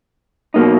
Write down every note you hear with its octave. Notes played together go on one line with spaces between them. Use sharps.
B2 F#3 A#3 D#4